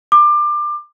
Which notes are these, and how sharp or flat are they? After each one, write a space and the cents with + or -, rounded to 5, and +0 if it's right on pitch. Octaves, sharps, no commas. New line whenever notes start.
D6 +25